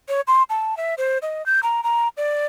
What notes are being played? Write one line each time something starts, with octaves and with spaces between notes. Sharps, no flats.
C#5
C6
A5
E5
C5
D#5
G6
A#5
A#5
D5